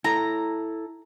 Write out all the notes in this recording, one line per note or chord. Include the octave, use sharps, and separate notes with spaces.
E4 A4 A#5